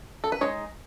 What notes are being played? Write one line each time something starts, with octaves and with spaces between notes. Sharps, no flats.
A4
B4
G#3 D#4 C#5